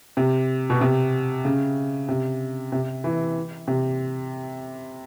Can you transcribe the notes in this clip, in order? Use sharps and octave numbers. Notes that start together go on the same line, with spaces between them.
C3
B2
C3
C#3
C3
C3
E3
C3